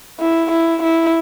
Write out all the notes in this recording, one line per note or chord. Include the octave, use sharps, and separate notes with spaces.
E4
E4
E4